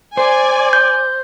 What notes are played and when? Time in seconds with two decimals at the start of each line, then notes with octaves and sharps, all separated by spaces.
0.17 C5 D5 G#5
0.73 G6